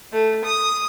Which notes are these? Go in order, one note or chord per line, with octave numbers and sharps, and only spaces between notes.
A3
D#6